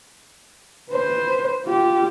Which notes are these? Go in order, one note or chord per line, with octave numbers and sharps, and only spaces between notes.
B4 C5
F4 G4